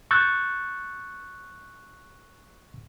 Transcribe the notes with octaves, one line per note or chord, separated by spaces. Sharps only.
C#6 E6 F#6 G6 A6